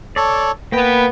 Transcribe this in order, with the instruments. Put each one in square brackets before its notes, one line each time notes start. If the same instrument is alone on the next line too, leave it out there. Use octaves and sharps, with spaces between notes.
[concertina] A4 C#5 [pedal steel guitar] D5 A5
[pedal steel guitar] A#3 B4 [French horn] B3 [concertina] G5